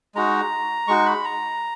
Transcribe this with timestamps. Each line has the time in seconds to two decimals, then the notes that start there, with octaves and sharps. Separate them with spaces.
0.15 G#3 D#4 F#4 A#5
0.88 G#3 D#4 F#4 C#6
1.06 B5
1.24 A#5